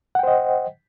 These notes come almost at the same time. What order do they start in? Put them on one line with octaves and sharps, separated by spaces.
F#5 G5 C5 D#5